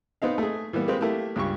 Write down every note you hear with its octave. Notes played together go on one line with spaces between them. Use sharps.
B3 C4 D#4 F5
A3 G#4
E3 G3 A#3 B3
G#3 A#3 C4 G4 B4
A3 A#3 E4 G4
C#2 G2 G4 C#6